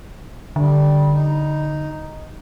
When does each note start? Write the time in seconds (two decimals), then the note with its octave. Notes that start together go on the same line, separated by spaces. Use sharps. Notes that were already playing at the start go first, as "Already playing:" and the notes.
0.56 D3 G3
1.12 D#4